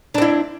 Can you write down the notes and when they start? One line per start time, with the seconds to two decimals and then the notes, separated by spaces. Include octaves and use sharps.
0.14 D4
0.18 C4
0.22 E4